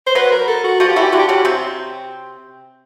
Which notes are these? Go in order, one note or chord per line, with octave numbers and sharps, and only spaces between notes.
C5
F#3 F#4 B4
A#4
A4
F#4
F3 F4 F#4
G4
E3 E4 F#4
G4
D3 D4 F#4
G4
C#3 C#4 F#4
C3 C4